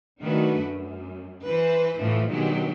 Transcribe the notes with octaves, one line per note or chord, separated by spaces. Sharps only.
D#3 F#3 A3 D4 F#4 B4
F#2
E3 B4 C5
A2 E3 F3 A3
B2 D#3 F#3 G#3 D4 G4